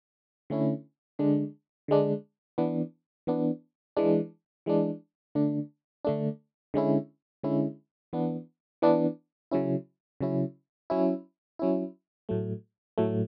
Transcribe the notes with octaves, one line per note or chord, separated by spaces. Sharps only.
D3 A3 C#4 E4
D3 G#3 D4
D3 G#3 D4
E3 B3 D4
E3 B3 D4
E3 G#3 D4
E3 G#3 D4
D3 A3 D4
D3 A3 D4
D3 G#3 C#4 E4
D3 G#3 C#4 E4
E3 B3 D4
E3 B3 D4
C#3 F#3 C#4 E4
C#3 F#3 C#4 E4
F#3 C#4 E4
F#3 C#4 E4
A2 F#3 A3
A2 F#3 A3